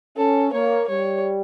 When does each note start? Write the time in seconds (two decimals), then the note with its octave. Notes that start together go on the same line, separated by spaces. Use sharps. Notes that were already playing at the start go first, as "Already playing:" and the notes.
0.17 C#4 A4
0.52 A#3 C#5
0.88 G3 C#5